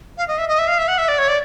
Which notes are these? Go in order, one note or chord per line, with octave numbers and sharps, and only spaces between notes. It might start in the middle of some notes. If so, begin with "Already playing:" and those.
F5
D#5
E5
D#5
E5
F5
E5
F#5
E5
D5
C#5
D5